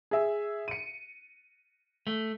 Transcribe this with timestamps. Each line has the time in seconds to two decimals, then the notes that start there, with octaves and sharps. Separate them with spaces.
0.11 G#4 E5
0.68 C#7 D#7
2.07 A3